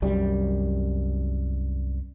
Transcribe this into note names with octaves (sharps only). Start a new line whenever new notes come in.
C2 F#2 G3